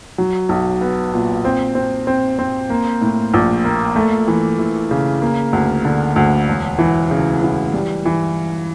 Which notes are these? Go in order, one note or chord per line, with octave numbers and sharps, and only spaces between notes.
F#3
B1
B3
A#2
C4
C4
C4
C4
A#3
A2
A#1
A#3
A3
E3
E3
C#3
A#3
D2
D3
D2
E1
E3
C#3
E3
G3
E3